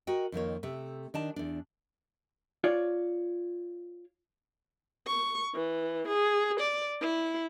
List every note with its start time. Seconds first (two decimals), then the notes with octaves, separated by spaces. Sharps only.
0.07 F#4 A#4 D#5 G5
0.32 F2 D#3 A#3 C#5
0.63 C3 A3
1.14 D#3 D4 A5
1.36 E2 D4
2.64 F4 C#5 D5
5.07 C#6
5.54 E3
6.07 G#4
6.60 D5
7.01 E4